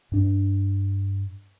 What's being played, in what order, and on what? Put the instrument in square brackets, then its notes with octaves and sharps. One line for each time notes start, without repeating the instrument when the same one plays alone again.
[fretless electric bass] G2 D4